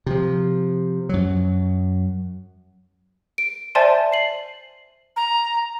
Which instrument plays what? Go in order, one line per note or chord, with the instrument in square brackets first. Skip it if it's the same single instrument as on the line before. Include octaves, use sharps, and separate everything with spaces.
[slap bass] C3 F3
F#2 F#3
[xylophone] D7
C5 D5 E5 G#5 A5 C6
C7 F#7
[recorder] A#5